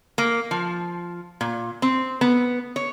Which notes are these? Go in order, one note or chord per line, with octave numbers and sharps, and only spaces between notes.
A#3
F3
A#2
C4
B3
C#5